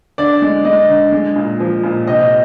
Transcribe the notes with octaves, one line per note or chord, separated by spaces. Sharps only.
D3 D5
G#3
G#3 D#5
D3
G#3
A#2
F3
A#2
C3 D#5